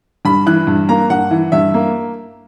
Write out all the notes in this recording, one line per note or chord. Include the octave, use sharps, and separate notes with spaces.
G2 B5
E3 F#6
G2
A#3 A#5
G2 F#5
E3
G2 E5
A#3